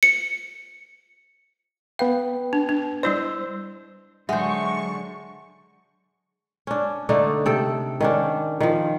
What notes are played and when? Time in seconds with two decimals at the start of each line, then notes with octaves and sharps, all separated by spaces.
0.03 C#7
1.99 B3 B4 F5 G5
2.53 D4
2.69 D4
3.03 G3 E4 C5 D5 E6 G6
4.29 D3 F#3 G#3 C5 E5 F#5 C#6
6.67 C#4 D4
7.09 D3 A3 D4 D#4
7.46 C3 A4 G5
8.01 D#3 C#4 D4
8.60 D#3 F3